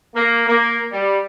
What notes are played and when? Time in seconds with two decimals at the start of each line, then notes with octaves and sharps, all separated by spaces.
0.15 A#3
0.47 A#3
0.92 G3